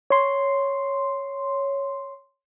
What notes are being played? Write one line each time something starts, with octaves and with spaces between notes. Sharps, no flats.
C#5 C6